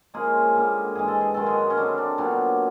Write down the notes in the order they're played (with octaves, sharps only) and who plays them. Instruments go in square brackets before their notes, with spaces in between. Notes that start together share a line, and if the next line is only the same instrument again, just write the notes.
[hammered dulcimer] C#3 F3 G#3 A#3 G#4
D3 G3 A#3
G#2 E3 G#3 G#4
A4
G#4
F#2 D#3 G#3 A4
G#3 G#4
C#4
D3 G3 C4 D4
D4
A#2 F#3 B3 D4